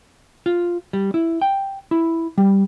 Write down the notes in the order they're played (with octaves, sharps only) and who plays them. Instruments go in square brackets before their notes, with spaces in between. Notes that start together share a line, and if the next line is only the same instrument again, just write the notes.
[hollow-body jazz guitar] F4
G3
E4
G5
E4
G3